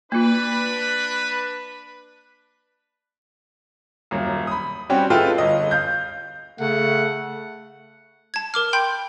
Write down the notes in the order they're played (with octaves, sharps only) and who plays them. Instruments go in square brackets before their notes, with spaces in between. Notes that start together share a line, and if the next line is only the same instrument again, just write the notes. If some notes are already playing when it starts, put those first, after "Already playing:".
[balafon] A#3 F4 [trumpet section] D4 B4
[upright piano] D#1 F#2
B5 D#6
G3 C4 C#4 F#4 G4
G#3 E4 F4 A4 B4 G5
G1 D#5
F5 G6
[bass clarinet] C#3 [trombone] A3 [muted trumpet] F#5
[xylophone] A5 G#6
A#4 D6 F6
G5 B5 C6 G6